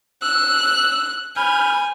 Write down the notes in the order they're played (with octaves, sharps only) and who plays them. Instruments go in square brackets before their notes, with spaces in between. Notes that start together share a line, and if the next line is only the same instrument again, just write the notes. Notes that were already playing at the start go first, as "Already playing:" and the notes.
[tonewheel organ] E6 [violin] F#6
[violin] G#5 [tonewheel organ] B5 F6 G6